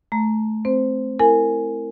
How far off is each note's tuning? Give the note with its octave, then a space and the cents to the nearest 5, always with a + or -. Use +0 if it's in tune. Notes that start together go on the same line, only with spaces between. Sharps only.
A3 -20 A#5 +0
C4 +0 C5 -10
E4 +0 A#4 -30 G#5 +0